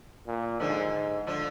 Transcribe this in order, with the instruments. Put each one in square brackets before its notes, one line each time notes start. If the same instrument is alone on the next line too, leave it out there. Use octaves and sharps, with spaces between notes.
[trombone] A#2
[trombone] G#2 [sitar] D3 F3
[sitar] D3 F3